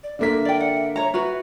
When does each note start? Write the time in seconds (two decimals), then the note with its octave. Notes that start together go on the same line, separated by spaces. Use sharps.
0.03 D5
0.19 D3 A#3 E5 B6
0.45 D5 G5
0.60 F#5
0.96 C#5 A#5
1.14 F#4 B4